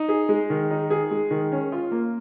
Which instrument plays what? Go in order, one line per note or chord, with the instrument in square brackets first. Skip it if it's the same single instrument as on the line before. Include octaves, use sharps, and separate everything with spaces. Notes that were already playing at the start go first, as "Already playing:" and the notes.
Already playing: [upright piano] D#4
G#4
G#3
D#3
D#4
G#4
G#3
D#3
C#4
F4
A#3